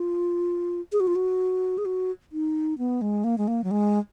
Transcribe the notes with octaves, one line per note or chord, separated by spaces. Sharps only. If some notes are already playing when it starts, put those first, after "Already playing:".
Already playing: F4
G#4
F#4
F4
F#4
G#4
F#4
D#4
B3
G#3
A#3
G#3
A#3
F#3
G#3